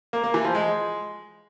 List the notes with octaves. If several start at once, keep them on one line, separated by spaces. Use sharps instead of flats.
A#3
A#3
E3
F3
G#3